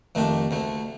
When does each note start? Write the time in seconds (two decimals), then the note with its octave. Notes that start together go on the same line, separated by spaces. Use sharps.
0.15 F2 D#3 A3 D4 G4
0.51 D2 D3 A3